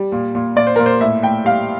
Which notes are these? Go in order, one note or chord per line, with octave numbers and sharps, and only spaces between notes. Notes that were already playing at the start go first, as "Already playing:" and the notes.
Already playing: G3
A#2
A#2
A#2 D5
C5
A#2 A#4
C5
A2 E5
A2 G5
G3 F5